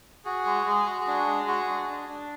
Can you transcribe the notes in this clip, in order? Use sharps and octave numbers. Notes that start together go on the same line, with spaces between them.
F#4 G#4
G#3
G#3
F#4
D4
G#3
F#4
D4
D4
D4